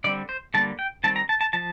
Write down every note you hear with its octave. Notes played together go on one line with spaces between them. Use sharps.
D3 G3 C4 D5
C5
D3 G3 A#3 A5
G5
D#3 G3 C4 A5
A#5
A5
A5
F3 A5